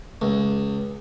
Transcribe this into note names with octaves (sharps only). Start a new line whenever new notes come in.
C#2